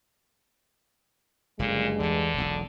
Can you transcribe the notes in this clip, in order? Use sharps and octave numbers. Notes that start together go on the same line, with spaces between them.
F#1 G2 A#2 D3 G#3
E2 D3 E3
E1 B1